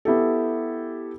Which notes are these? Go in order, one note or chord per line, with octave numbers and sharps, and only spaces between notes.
B3 E4 G4 A4